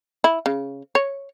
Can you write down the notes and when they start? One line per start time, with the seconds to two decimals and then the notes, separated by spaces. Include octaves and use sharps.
0.24 E4
0.46 C#3
0.95 C#5